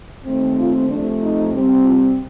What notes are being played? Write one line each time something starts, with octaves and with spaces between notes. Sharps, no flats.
D#2 D#3 A3 C4
F4
C3 F3 A3 D4
D#4
C3 G3 C4
F4